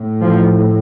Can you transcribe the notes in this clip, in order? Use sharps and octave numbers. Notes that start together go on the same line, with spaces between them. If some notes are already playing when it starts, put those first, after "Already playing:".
Already playing: A2
F3